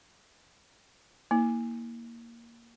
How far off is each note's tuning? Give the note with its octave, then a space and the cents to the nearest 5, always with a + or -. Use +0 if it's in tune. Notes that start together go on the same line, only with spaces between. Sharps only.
A#3 +0 E4 -30